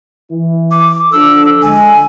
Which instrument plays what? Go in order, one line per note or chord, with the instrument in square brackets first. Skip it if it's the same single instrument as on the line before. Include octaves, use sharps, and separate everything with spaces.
[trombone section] E3 E4
[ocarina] D6
[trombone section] F3 D4 A4 [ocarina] E6
[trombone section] D3 G#3 [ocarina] G#5